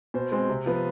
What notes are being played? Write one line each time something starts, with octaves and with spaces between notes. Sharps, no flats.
B2 C5
G#3 C4
C3
F3 B3